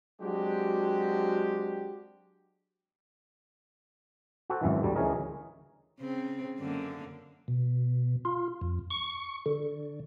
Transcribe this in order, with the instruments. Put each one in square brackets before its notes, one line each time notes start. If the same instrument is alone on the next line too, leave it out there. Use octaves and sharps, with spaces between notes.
[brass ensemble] F#3 G#3 C4 D4 F#4 G4
[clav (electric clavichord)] F#4 A4 C5
G#1 F#2 E3
D2 D3 G3
D2 E3 C#4 G#4 A#4 D#5
[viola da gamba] C#3 C4
F#2 D3 A#3
[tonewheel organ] B2
F4
F2
C#6
D3